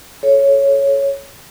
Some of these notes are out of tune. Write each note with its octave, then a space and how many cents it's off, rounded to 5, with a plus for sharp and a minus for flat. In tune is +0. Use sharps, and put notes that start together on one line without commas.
A4 -20 C#5 +0